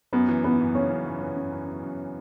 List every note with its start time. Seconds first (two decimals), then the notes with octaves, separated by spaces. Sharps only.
0.13 F#2 B3
0.28 E3
0.44 E3 B3
0.59 F#2
0.75 C#3 C#4
0.90 F#2
1.06 F#2
1.21 E3
1.36 C#3
1.52 F#2
1.67 F#2
1.83 F#2